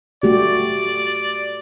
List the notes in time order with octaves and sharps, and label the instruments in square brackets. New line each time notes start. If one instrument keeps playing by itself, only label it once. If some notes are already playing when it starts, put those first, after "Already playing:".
[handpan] A3 F#4 G4 [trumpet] D5